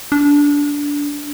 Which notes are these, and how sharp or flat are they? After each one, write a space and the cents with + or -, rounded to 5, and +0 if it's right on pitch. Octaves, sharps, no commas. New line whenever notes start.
D4 -20